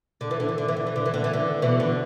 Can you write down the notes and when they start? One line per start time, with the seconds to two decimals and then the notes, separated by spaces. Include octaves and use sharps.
0.21 D3
0.31 E3
0.40 D3
0.49 E3
0.58 D3
0.68 E3
0.77 D3
0.87 E3
0.96 D3
1.06 E3
1.14 D3
1.24 E3
1.33 D3
1.62 B2 E3
1.80 D3